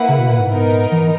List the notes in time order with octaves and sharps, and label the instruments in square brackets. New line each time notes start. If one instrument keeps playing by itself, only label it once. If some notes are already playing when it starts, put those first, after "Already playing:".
Already playing: [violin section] A#3 E4 B4 F#5
[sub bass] C#3
B2
A#2
G#2
[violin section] B3 D#4 A#4
[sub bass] E3